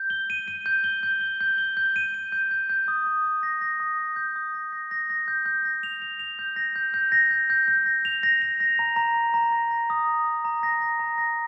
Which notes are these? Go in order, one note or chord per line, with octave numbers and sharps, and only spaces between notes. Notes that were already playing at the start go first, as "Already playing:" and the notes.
Already playing: G6
G7
D#7
D#7
G6
G7
G6
G7
G6
G7
G6
D#7
D#7
G6
G6
G6
D#6
D#6
D#6
A#6
A#6
D#6
D#6
G6
D#6
A#6
A#6
A#6
A#6
G6
G6
A#6
F7
F7
F7
G6
A#6
G6
G6
A#6
G6
G6
G6
A#6
F7
A#6
F7
A#6
A#5
A#5
A#5
A#5
A#6
A#6
D#6
A#5
D#6
A#5
A#6
A#6
A#5
A#6